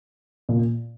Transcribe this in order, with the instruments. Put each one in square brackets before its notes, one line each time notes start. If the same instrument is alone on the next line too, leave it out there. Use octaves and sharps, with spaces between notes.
[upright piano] A#2